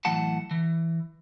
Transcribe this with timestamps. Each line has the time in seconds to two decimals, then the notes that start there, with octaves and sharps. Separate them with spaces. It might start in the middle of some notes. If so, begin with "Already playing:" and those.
0.05 A2 E3 F#3 F#5 A5
0.51 E3